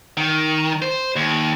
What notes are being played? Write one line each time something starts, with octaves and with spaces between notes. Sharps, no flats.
D#3
C5
D#2